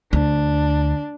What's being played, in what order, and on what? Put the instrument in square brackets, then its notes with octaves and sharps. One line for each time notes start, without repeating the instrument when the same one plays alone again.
[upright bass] D2 [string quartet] D4